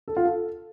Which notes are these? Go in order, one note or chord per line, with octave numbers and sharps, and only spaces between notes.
A4
F4
A4